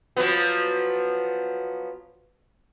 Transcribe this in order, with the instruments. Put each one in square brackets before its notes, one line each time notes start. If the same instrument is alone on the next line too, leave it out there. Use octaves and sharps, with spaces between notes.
[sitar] F3 F#3 B3